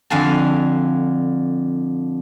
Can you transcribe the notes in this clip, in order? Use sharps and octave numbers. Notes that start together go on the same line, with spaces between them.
F2 D3 F5 G#5 A5